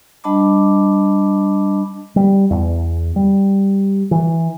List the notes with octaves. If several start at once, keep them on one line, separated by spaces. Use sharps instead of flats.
G3 D4 D#5 A5 B5 D6
G3
E2
G3
E3